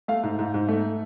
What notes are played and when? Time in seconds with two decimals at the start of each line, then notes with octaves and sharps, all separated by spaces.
0.08 A3 F5
0.23 G#2
0.39 G#2
0.54 G#2
0.68 A3